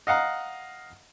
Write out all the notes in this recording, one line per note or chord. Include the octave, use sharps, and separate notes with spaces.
D#5 F5 F#5 A#5